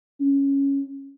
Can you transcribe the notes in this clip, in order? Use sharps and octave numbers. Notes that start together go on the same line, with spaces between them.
C#4